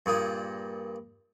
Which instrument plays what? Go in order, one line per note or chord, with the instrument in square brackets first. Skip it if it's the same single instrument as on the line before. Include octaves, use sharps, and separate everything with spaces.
[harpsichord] G2 A#2 G#4